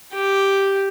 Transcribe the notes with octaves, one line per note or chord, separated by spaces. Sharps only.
G4